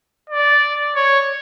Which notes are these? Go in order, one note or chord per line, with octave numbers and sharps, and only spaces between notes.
D5
C#5